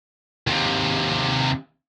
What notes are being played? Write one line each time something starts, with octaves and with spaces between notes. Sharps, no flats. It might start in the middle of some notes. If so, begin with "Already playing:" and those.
D#2 C3